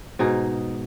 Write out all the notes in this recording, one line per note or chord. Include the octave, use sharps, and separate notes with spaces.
G#2 B2 D#4 G#4